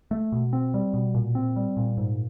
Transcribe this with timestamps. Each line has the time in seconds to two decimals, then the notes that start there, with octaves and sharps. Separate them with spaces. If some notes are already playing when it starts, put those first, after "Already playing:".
0.11 A3
0.32 B2
0.53 C4
0.74 G3
0.94 B2
1.14 A#2
1.35 C4
1.56 G3
1.77 A#2
1.97 G#2